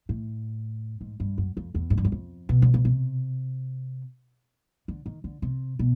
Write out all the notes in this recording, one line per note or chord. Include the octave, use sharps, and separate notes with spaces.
A2
G#2
G2
F#2
F2
E2
G#2
G2
F#2
F2
B2
D3
C#3
C3
D3
D#3
D3
C3
B2